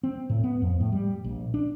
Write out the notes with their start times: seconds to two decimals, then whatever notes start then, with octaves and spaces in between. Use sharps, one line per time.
0.03 C4
0.30 A2
0.44 B3
0.62 F2
0.80 A2
0.93 G3
1.24 A#1
1.54 D4